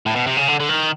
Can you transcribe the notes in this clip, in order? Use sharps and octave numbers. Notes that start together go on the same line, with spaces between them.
A2
B2
C3
C#3
D3
D3
D#3